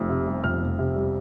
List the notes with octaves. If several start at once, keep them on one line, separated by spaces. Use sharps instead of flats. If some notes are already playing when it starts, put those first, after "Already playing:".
Already playing: F1 F2
C3
G3
F2 F6
F1
C3
G3